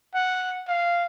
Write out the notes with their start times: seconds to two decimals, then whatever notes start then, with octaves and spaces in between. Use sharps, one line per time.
0.14 F#5
0.68 F5